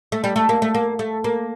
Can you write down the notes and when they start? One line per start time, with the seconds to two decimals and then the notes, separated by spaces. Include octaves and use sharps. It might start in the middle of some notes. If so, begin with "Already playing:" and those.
0.12 A3
0.24 G3
0.36 A3
0.49 A#3
0.62 A3
0.75 A#3
0.99 A3
1.24 A#3